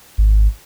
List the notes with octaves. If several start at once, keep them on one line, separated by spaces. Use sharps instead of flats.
G#1